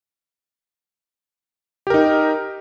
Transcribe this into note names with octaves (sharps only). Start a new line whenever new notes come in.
D#4 G4 A#4